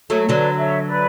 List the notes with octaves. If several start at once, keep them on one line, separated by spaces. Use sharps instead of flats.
F#3 A3 A4 C#5
D3 F#3 B4 D5
C#5 E5
B4 D5